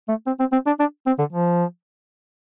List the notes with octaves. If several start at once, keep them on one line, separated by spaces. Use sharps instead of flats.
A3
C4
C4
C4
D4
D4
C4
D3
F3